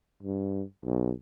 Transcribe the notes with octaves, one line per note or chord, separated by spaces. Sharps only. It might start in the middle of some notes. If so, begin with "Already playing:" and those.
G2
B1